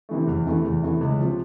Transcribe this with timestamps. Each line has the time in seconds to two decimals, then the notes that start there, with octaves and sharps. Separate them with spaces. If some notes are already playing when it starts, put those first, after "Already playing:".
0.09 C3 E3 A3
0.27 E2
0.46 C3 E3 A3
0.64 E2
0.82 C3 E3 A3
1.01 C#2
1.20 C3 F3